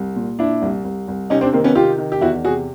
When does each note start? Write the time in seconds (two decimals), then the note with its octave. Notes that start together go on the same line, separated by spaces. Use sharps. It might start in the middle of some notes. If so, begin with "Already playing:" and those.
Already playing: C2
0.16 A#2
0.39 A#2 D4 E4
0.62 C2
0.85 C2
1.08 C2
1.30 C3 C#4 D#4
1.41 C4 D4
1.53 D#3 A#3 C4
1.64 B3 C#4
1.75 C3 F4 G4
1.98 D#3
2.12 G4
2.21 E2 E4 F#4
2.45 C3 F#4 G#4